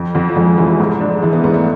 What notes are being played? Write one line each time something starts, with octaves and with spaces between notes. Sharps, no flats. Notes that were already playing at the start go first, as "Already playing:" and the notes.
Already playing: F2
F2
F3
F2 G#3
F3
F1 E3
G#2
D4
E3 G#3
B3
G#2 B3
A3